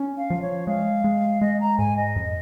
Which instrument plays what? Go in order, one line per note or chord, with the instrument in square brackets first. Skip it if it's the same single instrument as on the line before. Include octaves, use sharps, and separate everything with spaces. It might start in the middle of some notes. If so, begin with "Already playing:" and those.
Already playing: [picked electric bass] C#4
[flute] F5
[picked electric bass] F3
[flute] C#5
[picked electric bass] G#3 [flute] F5
[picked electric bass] G#3
[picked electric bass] G#3 [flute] D#5
[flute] A#5
[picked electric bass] G#2 [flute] G#5
[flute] D#5
[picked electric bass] F2